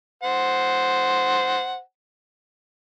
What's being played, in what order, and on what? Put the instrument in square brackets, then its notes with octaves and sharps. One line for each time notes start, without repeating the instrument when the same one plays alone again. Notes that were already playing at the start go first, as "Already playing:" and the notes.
[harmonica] C5 F#5